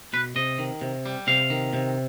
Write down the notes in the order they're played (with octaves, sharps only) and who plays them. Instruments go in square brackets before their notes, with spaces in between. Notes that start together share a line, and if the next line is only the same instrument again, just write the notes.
[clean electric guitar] B2 B4
C3 D#5
D#3
C3
G3
C3 F5
D#3
C3